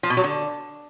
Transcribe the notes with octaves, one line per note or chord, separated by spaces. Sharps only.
F3
B2
F#3
D3